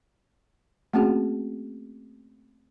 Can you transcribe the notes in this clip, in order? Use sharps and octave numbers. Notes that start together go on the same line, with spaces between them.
A3 A#3 C4 C#4 F#4 G#4